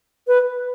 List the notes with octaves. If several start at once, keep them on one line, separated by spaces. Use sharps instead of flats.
B4